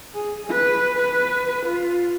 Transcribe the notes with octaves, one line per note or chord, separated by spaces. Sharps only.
G#4
B4
B4
F4